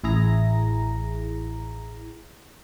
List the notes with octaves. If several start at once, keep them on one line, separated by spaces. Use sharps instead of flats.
A1 E4 G#4 A#5 A#6